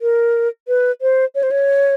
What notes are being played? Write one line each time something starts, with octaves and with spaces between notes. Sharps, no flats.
A#4
B4
C5
C#5
C5
C#5